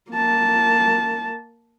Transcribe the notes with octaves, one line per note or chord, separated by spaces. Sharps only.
A#3 A5